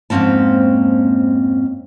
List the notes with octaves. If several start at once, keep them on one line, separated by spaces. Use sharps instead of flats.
F2 G#2 A#3 C4 C#4 A5